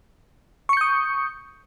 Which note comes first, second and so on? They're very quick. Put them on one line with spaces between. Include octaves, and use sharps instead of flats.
C#6 C#7 G6 D#6